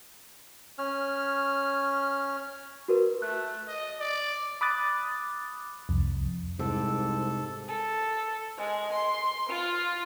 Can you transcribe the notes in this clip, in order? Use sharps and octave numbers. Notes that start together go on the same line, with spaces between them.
C#4 F6
F#4 A#4 B4
A3 F#6
D#5
D5
B5 D6 D#6 F#6 A6
C2 F2
C2 G#2 C3 A4
A4
G#3
C6
F4